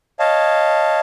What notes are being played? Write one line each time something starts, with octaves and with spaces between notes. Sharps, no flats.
C#5 D#5 F5 A5